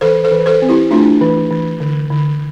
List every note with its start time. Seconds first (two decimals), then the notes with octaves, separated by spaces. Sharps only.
0.01 E3 A4 C5
0.24 A4 C5
0.31 E3
0.46 A4 C5
0.62 C4
0.69 E4 G4
0.91 A3 D4 F4
1.21 E3
1.51 E3
1.80 D3
2.10 D3